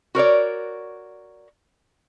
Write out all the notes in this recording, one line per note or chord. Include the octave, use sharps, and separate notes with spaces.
F#4 A#4 C#5 D5